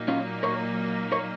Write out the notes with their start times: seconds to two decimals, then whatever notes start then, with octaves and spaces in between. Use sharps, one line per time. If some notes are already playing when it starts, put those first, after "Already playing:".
Already playing: A#2 F#3 A#3 D#4
0.08 C#4 F4
0.43 A#4 C#5
1.12 A#4 C#5